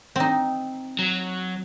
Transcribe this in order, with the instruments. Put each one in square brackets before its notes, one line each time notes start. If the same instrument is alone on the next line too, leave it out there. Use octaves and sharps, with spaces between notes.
[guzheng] C4 D#4
[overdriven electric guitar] F#3